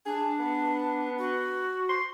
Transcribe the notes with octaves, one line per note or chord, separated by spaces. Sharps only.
D4 G#4
B3
F#4
C6